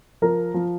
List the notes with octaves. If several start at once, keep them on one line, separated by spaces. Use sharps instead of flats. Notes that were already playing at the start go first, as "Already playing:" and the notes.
F3 A#4
F3